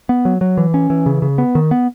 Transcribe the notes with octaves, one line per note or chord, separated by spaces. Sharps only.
B3
F#3
F#3
E3
C#4
E3
C#3
C#3
B3
D#3
B3